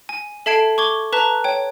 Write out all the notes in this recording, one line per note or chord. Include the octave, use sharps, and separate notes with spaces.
G#5
A4 E5 A5 G#6 C7 D7
C#6 D6 G#6 G7
B4 A5 A#5 F#6 B6
C#5 G5